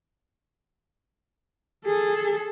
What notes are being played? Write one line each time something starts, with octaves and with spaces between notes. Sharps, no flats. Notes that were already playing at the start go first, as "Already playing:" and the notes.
G#4 A4